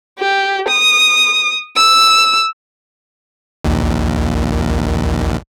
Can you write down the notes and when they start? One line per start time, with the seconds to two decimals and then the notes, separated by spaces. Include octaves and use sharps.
0.19 G4
0.69 D#6
1.76 E6
3.64 A#1 D#2